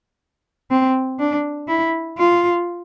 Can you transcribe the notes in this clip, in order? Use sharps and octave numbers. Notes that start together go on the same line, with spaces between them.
C4
D4
E4
F4